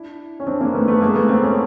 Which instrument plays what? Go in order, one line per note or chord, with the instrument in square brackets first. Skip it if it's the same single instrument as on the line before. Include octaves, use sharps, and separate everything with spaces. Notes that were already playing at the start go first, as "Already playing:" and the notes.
Already playing: [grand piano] D4 E4
C#4
C4 D4
A#3 C4
A3 B3
A3 B3
G#3 A#3
A3 B3
A#3 C4
B3 C#4